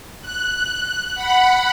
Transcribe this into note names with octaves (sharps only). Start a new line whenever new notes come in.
F#6
F#5 B5